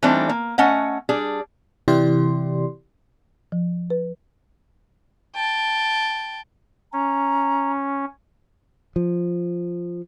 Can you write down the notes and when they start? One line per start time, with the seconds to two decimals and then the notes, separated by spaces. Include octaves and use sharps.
0.03 E3 G3 A3 C4 D4 D#4
0.29 A#3
0.58 A3 C#4 D#5 F#5
1.09 G3 D4 G#4
1.88 C3 E3 E4 G4 D5 C6
3.52 F3
3.90 B4
5.36 G5 A5
6.93 C#4 A#5
8.96 F3